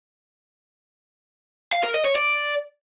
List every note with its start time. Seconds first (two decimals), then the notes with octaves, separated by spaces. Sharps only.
1.72 F5
1.83 A#4
1.94 D#5
2.05 C#5
2.16 D5